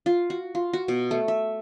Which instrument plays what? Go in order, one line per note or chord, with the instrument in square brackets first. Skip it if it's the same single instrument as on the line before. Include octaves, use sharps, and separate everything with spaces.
[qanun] F4
F#4
F4
F#4
B2
A3
E5